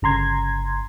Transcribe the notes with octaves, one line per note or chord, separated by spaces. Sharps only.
G1 C#3 A#5 C6 G#6